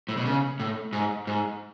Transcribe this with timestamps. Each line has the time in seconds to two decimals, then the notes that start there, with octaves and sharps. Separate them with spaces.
0.09 A2
0.17 B2
0.25 C#3
0.60 A2
0.93 G#2
1.27 G#2